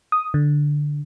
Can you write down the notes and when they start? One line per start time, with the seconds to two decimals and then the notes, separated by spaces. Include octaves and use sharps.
0.12 D#6
0.34 D3